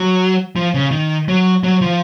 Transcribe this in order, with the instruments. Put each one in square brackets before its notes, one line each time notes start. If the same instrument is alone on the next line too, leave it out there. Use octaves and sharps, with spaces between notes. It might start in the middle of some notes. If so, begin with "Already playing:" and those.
Already playing: [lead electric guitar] F#3
F3
C#3
D#3
F#3
F#3
F3